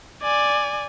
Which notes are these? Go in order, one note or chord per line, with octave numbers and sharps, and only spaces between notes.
D5 G#5